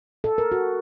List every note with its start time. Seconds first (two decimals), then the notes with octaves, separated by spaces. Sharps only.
0.24 A4
0.38 A#4
0.52 F#4